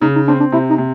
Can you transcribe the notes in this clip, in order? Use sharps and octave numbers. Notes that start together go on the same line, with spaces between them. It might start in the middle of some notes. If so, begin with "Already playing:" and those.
C#3 D#4
D#4
C4 D4
D4
C3 E4
D#4
C3